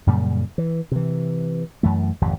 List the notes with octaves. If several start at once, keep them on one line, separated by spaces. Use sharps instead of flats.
F#2 A#2 C#3 G3
E3
C3 E3
F#2 E3 A3
G#1 F2 C3